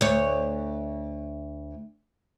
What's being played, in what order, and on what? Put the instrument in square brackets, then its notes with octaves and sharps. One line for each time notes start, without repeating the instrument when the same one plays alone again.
[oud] D2 C#5